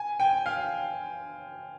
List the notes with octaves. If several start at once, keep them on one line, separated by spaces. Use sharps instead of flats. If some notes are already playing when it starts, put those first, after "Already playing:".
Already playing: G#5
G5
F5